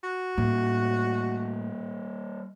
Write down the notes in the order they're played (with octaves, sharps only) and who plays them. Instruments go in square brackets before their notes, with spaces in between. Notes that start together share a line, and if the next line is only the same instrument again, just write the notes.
[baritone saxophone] F#4
[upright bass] A2 [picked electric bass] G3 A#3